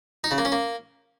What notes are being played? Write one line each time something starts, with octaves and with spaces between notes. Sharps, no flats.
D#4
C#3
A#3
C#4
A#3